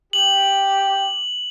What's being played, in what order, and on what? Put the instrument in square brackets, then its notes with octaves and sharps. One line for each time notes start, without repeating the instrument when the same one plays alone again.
[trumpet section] G4 [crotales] F#7